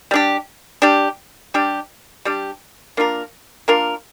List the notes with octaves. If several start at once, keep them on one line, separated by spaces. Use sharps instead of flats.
G3 D4 G4
G3 D4 G4
G3 D4 G4
G3 D4 G4
A#3 D4 F4 A#4
A#3 D4 F4 A#4